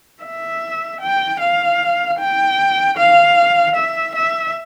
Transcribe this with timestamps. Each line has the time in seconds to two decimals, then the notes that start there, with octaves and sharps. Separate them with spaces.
0.24 E5
1.01 G5
1.41 F5
2.20 G5
2.98 F5
3.77 E5
4.15 E5